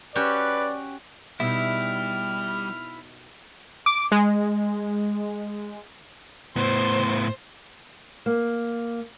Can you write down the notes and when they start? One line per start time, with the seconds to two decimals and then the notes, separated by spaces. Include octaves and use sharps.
0.15 C#4 F#4 G4 B4 D5
1.40 B2 G3 D#4 E4 E5 F6
3.86 D6
4.12 G#3
6.56 A2 B3 C5
8.26 A#3